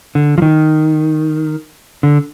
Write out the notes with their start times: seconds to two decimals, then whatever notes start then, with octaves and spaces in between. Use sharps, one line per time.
0.15 D3
0.38 F3
0.42 D#3
2.03 D3